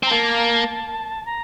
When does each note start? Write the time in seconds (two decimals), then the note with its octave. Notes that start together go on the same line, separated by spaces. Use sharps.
0.03 C4
0.06 A#5
0.11 A#3 A5
1.25 A#5